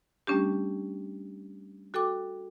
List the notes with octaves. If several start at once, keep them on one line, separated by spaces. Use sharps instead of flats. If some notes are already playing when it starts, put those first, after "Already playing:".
G3 A3 C#4 D4 G4
F#4 A4 G5 D6